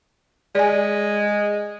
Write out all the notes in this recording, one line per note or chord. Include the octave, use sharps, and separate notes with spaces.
G#3 D5 G#5